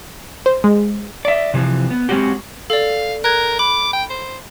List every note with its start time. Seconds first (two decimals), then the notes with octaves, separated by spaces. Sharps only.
0.46 C5
0.64 G#3
1.25 D5 E5
1.54 C3 E3 F3
1.90 B3
2.09 G#3 C4 C#4 F#4 G4
2.70 A4 D5 F5
3.24 A#4 F#6 G#6
3.59 B5 D6
3.93 G5
4.10 C5